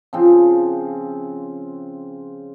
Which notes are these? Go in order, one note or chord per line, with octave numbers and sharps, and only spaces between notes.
C#3 F3 C4 F4